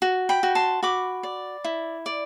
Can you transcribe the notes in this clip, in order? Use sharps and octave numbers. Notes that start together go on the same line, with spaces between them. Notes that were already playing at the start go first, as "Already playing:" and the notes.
F#4
G5 B5
F#4
A5 C6
F#4 B5 D6
D5
E4
D5